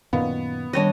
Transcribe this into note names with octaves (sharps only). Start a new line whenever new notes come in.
F#2 A#2 D#3 B3 F5
D#3 G3 D4 C#5 D#5